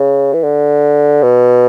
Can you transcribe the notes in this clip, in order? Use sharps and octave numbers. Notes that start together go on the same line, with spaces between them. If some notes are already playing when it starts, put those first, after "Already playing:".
Already playing: C#3
E3
D3
B2